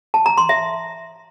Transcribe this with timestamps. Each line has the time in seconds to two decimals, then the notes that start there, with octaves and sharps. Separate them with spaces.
0.14 A5
0.26 A#5
0.38 C6
0.49 E5